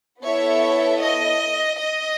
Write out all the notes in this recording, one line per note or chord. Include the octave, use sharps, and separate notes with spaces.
B3 E4 A4 C#5 E5
D#5
D#5